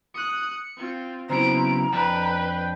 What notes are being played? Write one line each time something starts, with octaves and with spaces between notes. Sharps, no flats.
D#6 F#6 C#7
C4 F4
C#3 F#3 B3 C4 E4 A#5 D7
F2 D4 B4 G5 A5